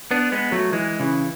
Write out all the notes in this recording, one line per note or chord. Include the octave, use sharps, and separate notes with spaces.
B3 D4
G#3 B3
F#3 A3
E3 G#3
C#3 E3